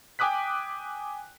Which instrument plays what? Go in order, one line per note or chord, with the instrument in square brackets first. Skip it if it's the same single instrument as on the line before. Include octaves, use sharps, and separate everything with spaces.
[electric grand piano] G5 G#5 D6 D#6 F#6 B6